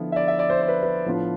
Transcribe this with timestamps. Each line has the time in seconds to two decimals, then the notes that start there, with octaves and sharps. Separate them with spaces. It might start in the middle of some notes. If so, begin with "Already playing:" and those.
Already playing: D3 F3 B3 E4
0.12 E5
0.16 D5
0.28 E5
0.39 D5
0.50 C5
0.62 C5
0.68 B4
0.83 B4
1.06 A2 F3 B3 D4 F4